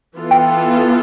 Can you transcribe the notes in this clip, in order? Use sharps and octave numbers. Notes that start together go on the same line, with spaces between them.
E3 B3 F4 A4
G5